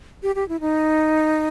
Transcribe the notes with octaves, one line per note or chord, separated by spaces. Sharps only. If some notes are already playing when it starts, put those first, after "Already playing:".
G4
G4
E4
D#4